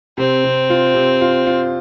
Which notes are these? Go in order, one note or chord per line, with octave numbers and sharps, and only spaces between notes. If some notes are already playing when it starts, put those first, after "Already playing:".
C3 C4
C3
F4
C3
F4
F4